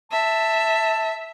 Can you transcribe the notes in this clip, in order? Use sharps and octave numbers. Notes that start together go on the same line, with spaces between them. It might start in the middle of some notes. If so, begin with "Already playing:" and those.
E5 A5